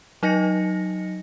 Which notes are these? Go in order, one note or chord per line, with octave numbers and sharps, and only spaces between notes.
F#3 D#4 D#5 A#6 C#7